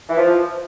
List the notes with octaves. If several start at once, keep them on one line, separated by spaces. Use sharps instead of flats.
E3
F3